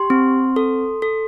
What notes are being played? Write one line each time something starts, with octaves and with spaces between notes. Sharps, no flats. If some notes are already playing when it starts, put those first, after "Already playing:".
Already playing: G4 C6
C4
A4
A4